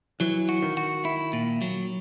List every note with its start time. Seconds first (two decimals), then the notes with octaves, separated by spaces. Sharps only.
0.20 E3 F#3
0.49 F#4
0.62 D#3
0.77 F#4
1.05 E4
1.33 A#2
1.62 F#3